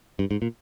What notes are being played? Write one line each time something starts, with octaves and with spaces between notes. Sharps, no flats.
G2
G#2
A#2